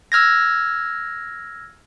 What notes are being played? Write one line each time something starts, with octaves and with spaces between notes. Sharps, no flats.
E6 F6 G#6 A#6